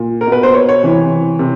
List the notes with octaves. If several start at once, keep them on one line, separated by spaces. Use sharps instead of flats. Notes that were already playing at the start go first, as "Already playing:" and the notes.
Already playing: A#2
A#4
B2 B4
C5
C#5
C#5
C3 E3
C3